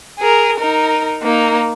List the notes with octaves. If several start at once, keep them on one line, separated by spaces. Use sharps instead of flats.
G#4 A#4
D#4 A#4
A#3 D#4